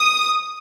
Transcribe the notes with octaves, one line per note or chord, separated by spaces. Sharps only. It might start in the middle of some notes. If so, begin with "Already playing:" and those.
Already playing: D#6